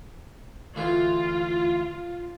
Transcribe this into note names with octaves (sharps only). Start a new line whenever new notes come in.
D2 E3 F4